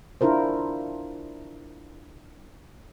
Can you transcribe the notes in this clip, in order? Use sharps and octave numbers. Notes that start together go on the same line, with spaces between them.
D4 E4 F4 A#4 C5